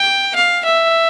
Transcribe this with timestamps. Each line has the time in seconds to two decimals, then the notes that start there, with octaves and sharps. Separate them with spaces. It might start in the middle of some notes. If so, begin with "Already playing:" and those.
Already playing: G5
0.35 F5
0.65 E5